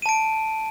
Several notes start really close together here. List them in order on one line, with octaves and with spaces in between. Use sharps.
D#7 A5 D7